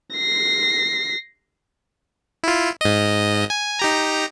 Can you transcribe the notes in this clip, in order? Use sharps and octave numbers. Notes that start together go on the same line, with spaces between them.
A#6 C7
E4 F4
G#2 D#5
G#5
D#4 G4 A#5